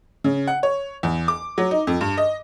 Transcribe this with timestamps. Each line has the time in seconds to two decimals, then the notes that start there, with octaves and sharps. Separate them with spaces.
0.24 C#3
0.48 F#5
0.63 C#5
1.03 E2
1.28 D6
1.58 F#3
1.71 D#4
1.87 F2
2.01 G2
2.18 D#5